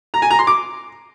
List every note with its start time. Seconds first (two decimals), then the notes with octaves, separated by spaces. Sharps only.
0.14 A#5
0.22 G#5
0.30 A#5
0.39 C6
0.47 D6